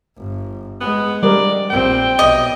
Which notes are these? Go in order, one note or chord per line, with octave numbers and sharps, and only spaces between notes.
G1
G#3 B3
G3 A#4 D5
A#1 C4 G5
B1 D#5